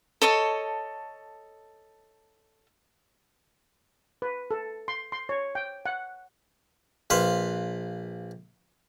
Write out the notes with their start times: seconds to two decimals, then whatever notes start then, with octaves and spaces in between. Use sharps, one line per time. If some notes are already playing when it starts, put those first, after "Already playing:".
0.22 A4 C#5 D#5 A5
4.22 B4
4.51 A4
4.88 C6
5.12 C6
5.29 C#5
5.55 G5
5.86 F#5
7.10 A#1 B4 C5 F5